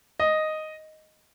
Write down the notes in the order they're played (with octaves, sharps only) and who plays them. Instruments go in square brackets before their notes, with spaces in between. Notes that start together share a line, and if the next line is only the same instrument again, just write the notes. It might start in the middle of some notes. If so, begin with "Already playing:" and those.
[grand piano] D#5